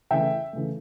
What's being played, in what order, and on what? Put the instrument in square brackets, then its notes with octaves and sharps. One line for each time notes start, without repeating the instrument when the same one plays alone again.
[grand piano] C#3 E3 A3 E5 G5
C#3 E3 A3